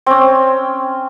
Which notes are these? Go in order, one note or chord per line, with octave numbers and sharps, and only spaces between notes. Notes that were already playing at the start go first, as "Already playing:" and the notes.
C4 C#4